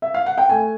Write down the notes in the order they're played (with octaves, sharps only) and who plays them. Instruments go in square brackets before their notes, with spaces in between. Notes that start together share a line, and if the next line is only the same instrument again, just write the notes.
[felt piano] E5
F5
F#5
G5
A3 G#5